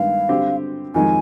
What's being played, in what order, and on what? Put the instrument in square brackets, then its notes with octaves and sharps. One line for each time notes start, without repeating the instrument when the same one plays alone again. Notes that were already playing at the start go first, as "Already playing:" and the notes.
Already playing: [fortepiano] G2 D#3 G#3 B3 [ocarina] F5
[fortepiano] D3 G3 C4 G4
[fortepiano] F2 D#3 G#3 [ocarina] G#5